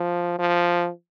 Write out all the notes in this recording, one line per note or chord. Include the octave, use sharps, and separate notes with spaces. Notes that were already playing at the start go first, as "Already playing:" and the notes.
Already playing: F3
F3